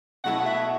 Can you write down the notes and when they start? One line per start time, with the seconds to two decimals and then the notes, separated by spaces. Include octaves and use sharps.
0.24 B2 F#3 A3 E4 A4 F#5
0.40 F#5
0.46 E5